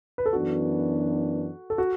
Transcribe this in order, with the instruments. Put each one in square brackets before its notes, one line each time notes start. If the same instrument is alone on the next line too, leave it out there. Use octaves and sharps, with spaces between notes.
[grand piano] B4
A4
[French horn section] F#2 E3 B3 D4 [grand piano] F#4
[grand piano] A4
F#4